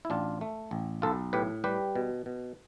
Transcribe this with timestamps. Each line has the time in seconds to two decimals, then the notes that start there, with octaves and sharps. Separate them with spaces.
0.05 E4
0.10 A1 D4 F4
0.41 A3
0.71 A1
1.02 B1 F4 A4
1.33 A2 G4 B4
1.64 G3 G4 B4
1.95 B2
2.26 B2